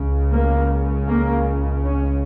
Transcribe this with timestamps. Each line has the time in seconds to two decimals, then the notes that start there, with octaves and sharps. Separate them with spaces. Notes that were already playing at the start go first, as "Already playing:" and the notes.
Already playing: C#2 C#3
0.31 A#3
1.07 A#3
1.84 C#4